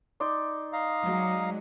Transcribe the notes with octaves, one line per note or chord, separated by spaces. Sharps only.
D#4 D5 C6
D#5 F5 A#5
F#3 G#3